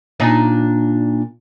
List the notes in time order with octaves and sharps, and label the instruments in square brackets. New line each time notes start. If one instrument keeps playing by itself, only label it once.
[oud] A#2 D4 D#4